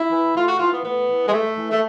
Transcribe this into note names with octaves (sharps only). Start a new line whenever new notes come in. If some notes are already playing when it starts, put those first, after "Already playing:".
Already playing: E4
E3
A2 F4
F#4
E3 F4
B3
A2 B3
E3
G#3
A2 A3
E3
A3